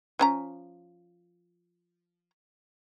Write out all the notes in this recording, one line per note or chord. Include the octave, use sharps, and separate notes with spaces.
F3 C#4 A#5